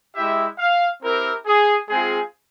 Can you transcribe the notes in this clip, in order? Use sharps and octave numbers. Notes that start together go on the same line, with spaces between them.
G#3 E4 G4 E5
F5
C4 E4 G4 A#4
G#4
G#3 C4 F4 G#4